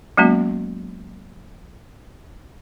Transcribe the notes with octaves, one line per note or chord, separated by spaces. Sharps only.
F#3 G#3 A#3 B3 C#4 F#4